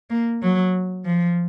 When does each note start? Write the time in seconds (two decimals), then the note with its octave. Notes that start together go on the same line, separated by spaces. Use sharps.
0.10 A#3
0.42 F#3
1.05 F3